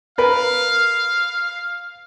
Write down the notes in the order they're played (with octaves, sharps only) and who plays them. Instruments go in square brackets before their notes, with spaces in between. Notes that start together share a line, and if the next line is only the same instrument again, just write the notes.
[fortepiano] A#4 B4 [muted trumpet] F5